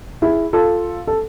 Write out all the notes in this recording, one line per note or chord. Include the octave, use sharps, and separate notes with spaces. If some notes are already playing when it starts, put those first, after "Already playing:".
E4 G#4
F4 A4
A4